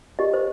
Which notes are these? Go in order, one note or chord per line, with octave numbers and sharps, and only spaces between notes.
G4 D#5
C5